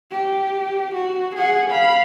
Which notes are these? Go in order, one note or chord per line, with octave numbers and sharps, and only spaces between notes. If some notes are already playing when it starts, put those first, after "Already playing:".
G4
F#4
G#4 F#5
F5 B5